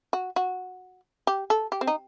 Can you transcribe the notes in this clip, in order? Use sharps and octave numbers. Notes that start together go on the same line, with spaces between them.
F#4
F#4
G4
A4
G4
C4
D#4